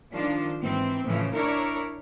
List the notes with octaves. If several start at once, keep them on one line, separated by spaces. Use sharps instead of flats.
D#3 F3 D4 F4
G#2 E3 C4
A2 C#3 E3 F3
D4 E4 A#4 C#5